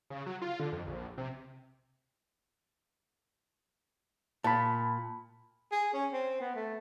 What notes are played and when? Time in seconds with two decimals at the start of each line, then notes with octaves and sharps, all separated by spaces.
0.10 C#3
0.26 F#3
0.42 F4
0.60 D3
0.73 F2
0.87 A#1
1.18 C3
4.44 A#2 A5 B5
5.72 G#4
5.94 C#4
6.13 C4
6.40 B3
6.56 A3